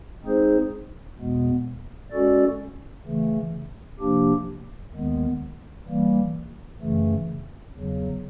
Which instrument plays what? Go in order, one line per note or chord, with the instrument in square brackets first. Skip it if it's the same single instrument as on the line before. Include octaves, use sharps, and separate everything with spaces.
[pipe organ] G#3 C4 D#4 G#4 C5
E2 B2 G#3 B3
G#3 C#4 F#4 A4 D5
C#3 E3 A3
C3 F3 A#3 D4 G4
D#2 D#3 G#3 B3
E3 G3 A#3
F#2 C#3 E3 A3
E2 C#3 F#3